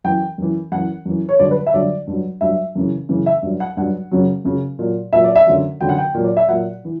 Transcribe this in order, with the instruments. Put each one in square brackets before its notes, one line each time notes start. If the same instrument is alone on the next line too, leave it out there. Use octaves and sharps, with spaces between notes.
[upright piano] F#2 E3 G5
F#2 E3
F#2 E3 F#5
F#2 E3
C#5
G2 D3 F#3 D5
B4
E5
G2 D3 F#3 D5
G2 F#3
G2 F#3 E5
F#2 C#3 E3
F#2 C#3 E3
E5
G2 F#3
F#5
G2 F#3 F#5
F#2 C#3 F#3
F#2 C#3 F#3
A#2 F#3
A#2 F#3 E5
D5
E5
F#2 D3 F#3
F#2 D3 F#3 G5
F#5
G5
A#2 F#3
D5
E5
A#2 F#3 F#5
E3